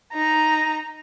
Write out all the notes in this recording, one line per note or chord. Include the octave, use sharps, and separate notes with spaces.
D#4 A#5